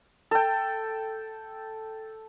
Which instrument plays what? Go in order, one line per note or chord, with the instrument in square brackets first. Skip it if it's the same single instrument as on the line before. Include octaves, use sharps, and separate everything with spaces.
[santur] A4 G5